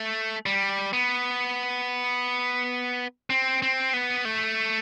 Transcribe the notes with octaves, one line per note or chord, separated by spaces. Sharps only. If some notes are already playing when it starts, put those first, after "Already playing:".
Already playing: A3
G3
B3
C4
C4
B3
A3